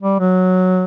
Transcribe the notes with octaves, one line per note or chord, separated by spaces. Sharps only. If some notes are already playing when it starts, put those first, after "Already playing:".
G3
F#3